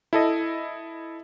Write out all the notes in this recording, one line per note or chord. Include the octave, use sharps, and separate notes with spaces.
E4 A4 D#5